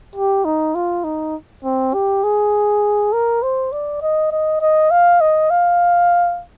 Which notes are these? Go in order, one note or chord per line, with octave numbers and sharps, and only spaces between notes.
G4
D#4
F4
D#4
C4
G4
G#4
A#4
C5
D5
D#5
D#5
D#5
F5
D#5
F5